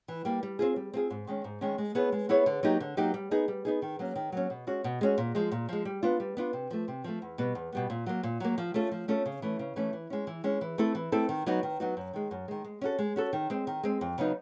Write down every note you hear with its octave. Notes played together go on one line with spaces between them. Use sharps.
E3
G3 A#3
G3
C4 F4 G#4
G3
C4 F4 G#4
G#2
D#3 G#3 C#4
G#2
D#3 G#3 C#4
G#3
B3 E4 G#4 C#5
G#3
B3 E4 G#4 C#5
D3
F#3 A#3 D#4 G4
D3
F#3 A#3 D#4 G4
G3
B3 D#4 G#4
G3
B3 D#4 G#4
D#3
F#3 A#3 C#4
D#3
F#3 A#3 C#4
B2
G#3 C#4 F#4
B2
G#3 C#4 F#4
A#2
F3 G#3
A#2
F3 G#3
G3
B3 D4 F4
G3
B3 D4 F4
C3
F3 A3
C3
F3 A3
E2
B2 G3 B3
E2
B2 G3 B3
A#2
F#3 A#3
A#2
F#3 A#3
F3
A3 C#4 F4 A4
F3
A3 C#4 F4 A4
C#3
E3 A3 C#4
C#3
E3 A3 C#4
E3
G#3 C#4
E3
G#3 C#4
E3
A3 C4 E4 A4
E3
A3 C4 E4 A4
D#3
F#3 B3 D#4 F#4
D#3
F#3 B3 D#4 F#4
F#2
D#3 G#3
F#2
D#3 G#3
G#3
C#4 F#4 A4
G#3
C#4 F#4 A4
D#3
G#3 C4
D#3
G#3 C4
F2
C#3 F#3 B3 D#4